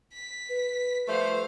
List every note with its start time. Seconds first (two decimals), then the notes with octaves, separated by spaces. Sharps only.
0.14 B6
0.49 B4
1.08 F3 G3 A3 C5 F5